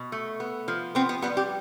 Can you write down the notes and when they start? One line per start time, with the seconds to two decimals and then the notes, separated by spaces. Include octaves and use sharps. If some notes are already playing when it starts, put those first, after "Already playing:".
Already playing: B2
0.12 A3
0.40 B3
0.68 F3
0.95 B3 C4
1.09 B3
1.22 G3 B3
1.37 G4